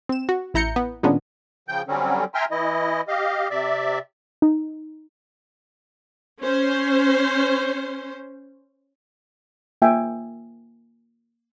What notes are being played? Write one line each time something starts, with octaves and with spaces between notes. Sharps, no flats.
C4 E7
F#4
A1 E4 A#5 G6 C#7
B3
A#2 D#3 G#3 B3 C#4 D4
C#3 F3 G5 G6
D3 F#3 G3 C4 C#4
E5 G5 G#5 A#5 C6 F6
E3 E4 D#5
G4 D#5 F5
C3 D5 E5
D#4
C#4 C5
A#3 F4 E5 G5 G#5